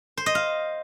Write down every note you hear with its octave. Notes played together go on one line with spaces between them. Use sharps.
C5
D#5
F5